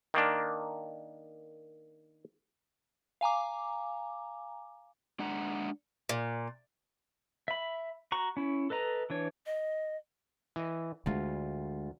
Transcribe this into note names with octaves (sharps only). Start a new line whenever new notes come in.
D#3 A#3 D4
F5 G#5 A#5 D6
G#3 D4 F#5 A#5
A#2
E5 B5
F#4 A#5 C#6
C#4 E4
A4 B4 D#5 A#5
E3 D4 C#5
D#5
E3 D#5
D2 D3 G#3 F4